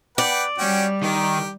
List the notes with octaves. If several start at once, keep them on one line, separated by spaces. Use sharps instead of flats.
B4 D5 F#5 G5
G3 C#4 F#4 G5
D#3 G4